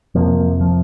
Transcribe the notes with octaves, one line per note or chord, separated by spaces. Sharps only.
F2 C3 F3 A#3
F3